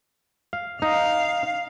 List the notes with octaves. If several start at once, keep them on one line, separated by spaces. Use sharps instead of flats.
F5
D#4 F5